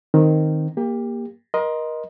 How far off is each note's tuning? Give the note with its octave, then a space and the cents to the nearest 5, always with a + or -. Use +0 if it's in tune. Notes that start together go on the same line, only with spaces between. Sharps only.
D#3 +0 C4 +0
A#3 +10 G4 +25
A#4 +30 D#5 +0 C6 +0